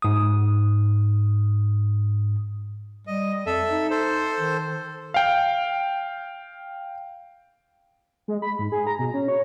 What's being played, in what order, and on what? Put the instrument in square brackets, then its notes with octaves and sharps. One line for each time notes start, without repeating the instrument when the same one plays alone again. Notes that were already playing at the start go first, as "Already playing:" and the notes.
[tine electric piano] G#2 D#6
[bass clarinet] G3 [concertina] D#5
[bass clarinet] F2 [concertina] A4 E5
[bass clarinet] D#4
[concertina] A4 C5
[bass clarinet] D#3
[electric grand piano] F5 G5
[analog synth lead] G#3
B5
G#2
G#4
A#5
B2
C#4
C#5